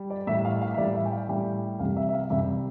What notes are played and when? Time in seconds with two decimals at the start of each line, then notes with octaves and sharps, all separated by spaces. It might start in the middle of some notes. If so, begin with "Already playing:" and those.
Already playing: G3
0.10 D5
0.27 A2 G3 E5
0.45 F5
0.62 F5
0.74 E5
0.78 G3 D5
0.81 A2
0.95 E5
1.06 G5
1.12 F5
1.29 A2 G3 G5
1.79 C2 C3 G3 F5
1.97 E5
2.09 E5
2.14 F5
2.30 C2 C3 G3 E5